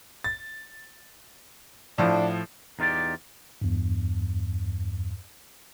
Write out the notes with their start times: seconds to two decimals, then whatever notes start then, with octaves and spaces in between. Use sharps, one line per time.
0.24 A6
1.98 A2 F3 D4
2.79 E2 D#4 F4 G4 D5
3.61 E2 G2